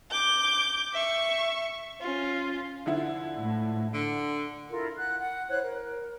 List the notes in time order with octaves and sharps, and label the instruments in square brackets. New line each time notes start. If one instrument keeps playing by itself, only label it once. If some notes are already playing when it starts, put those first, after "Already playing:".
[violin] D6 G6
E5 C#6
C#4 F4
[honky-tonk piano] D3 F3 E4
[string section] A2
[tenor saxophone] D3
[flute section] E4 F4 A4 A#4
F#5 F#6
F#5
E4 C5 C#5 F#6
A#4